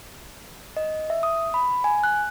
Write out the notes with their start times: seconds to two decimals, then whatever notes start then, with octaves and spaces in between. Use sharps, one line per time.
0.77 D#5
1.10 E5
1.23 D#6
1.54 B5
1.84 G#5
2.04 F#6